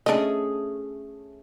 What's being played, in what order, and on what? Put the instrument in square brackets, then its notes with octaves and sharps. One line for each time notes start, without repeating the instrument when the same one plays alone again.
[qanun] A3 C#4 G#4 [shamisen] D4 D#5